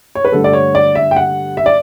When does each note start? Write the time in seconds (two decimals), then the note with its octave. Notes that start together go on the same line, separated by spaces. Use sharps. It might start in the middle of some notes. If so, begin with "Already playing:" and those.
0.15 C#5
0.25 B4
0.32 G2 D3 A3 A4
0.44 D5
0.53 C#5
0.75 D5
0.95 E5
1.11 G5
1.16 F#5
1.57 E5
1.66 D5